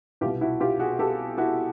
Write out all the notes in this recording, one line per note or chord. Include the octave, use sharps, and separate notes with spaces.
C2 B2 F4 G4
E4 F#4
F4 G4
F#4 G#4
G4 A4
E4 F#4